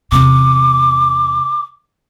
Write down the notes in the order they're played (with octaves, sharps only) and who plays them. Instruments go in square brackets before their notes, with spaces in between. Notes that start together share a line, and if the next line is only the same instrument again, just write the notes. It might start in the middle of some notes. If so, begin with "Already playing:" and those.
[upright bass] E2 C3 [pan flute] D6